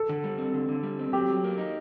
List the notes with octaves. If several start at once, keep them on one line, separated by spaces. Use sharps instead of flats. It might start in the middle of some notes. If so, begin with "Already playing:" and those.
Already playing: A4
D3
G3
C4
D3
D3
G3
C4
F#3 G4
F#3
A#3
D#4